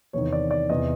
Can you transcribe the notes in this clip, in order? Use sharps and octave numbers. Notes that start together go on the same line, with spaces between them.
E2 C3 D#3 C#5
D5
D5
E2 C3 E3 D#5